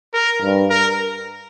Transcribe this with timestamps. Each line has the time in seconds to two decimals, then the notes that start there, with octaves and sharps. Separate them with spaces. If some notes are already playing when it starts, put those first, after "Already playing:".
0.14 A#4
0.42 G2
0.70 A#4